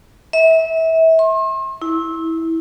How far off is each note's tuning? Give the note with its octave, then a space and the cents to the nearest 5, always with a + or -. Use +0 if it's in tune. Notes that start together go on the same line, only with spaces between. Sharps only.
E5 -30
C6 +40
E4 -15